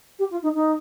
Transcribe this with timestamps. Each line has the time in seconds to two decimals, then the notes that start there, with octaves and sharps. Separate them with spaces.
0.19 G4
0.31 F4
0.43 D#4
0.54 D#4